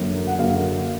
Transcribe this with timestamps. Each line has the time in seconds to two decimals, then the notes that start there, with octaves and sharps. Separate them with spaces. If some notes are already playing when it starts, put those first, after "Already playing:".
Already playing: F#2 D3 F#3 A#3
0.27 F#5
0.39 F#2 D3 F#3 A#3 F5